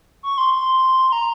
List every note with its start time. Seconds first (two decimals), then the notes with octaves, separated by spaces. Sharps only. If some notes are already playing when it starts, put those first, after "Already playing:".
0.23 C#6
0.38 C6
1.12 A#5